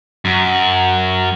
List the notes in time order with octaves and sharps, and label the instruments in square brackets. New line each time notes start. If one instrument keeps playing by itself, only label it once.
[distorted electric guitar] F#2